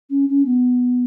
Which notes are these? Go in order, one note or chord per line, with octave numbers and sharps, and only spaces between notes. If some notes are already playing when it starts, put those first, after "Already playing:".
C#4
C#4
B3